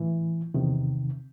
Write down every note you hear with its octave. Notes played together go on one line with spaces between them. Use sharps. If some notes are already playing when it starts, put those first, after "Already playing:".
Already playing: A2 E3
E2 C3 D#3